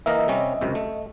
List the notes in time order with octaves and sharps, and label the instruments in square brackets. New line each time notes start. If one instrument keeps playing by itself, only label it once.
[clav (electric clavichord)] E3 A#3 A#4 [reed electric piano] D#5 E5
[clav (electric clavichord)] C3 G3 C#4
C#2 F#2 C3
A3